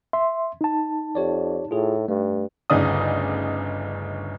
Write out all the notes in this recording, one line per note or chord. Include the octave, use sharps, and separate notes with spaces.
E5 C6
D#4 A5
F2 G4 C#5 D5
A2 F4 G#4
G2 A3
G1 D2 C#3 D#4 D5 D#6